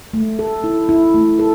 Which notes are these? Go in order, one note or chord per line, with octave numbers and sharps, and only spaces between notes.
A3
A4
E4
E4
A3
A4